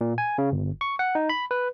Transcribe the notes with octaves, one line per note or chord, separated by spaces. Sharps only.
A#2
G#5
C#3
G1
C#6
F#5
D#4
B5
B4